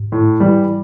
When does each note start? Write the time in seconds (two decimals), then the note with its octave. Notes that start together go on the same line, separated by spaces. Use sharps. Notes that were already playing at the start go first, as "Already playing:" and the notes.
Already playing: G#2
0.12 A2
0.40 E3 G3